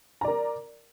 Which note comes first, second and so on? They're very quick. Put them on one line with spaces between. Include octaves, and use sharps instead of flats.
A#5 D5 A#4